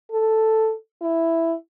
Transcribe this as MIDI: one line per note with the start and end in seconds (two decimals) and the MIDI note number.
0.12 0.72 69
1.02 1.53 64